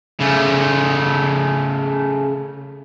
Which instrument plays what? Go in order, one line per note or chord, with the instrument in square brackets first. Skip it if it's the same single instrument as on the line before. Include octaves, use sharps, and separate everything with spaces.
[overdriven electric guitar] C#3 A3